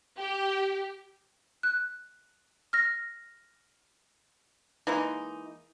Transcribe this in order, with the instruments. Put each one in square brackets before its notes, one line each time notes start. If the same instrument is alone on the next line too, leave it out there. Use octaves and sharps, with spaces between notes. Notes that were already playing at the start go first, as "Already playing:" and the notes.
[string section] G4
[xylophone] F#6
F6 A#6
[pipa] E3 G#3 A#3 D#4